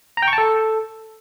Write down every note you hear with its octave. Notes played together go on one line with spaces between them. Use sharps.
A#5
G5
C#6
A5
A4